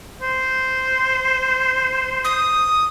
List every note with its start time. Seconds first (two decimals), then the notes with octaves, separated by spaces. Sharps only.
0.22 C5
2.24 D#6